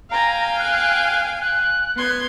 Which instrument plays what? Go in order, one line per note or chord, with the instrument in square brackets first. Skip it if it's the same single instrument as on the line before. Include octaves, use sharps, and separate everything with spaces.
[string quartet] F5 G5 G#5 [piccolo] A#5
[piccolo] F#6
F#6
[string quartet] B3 C6 G#6